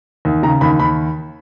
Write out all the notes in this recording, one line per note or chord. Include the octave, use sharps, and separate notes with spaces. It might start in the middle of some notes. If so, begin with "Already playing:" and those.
D#2
C#3 A#5
D#2 B5
D#2 B5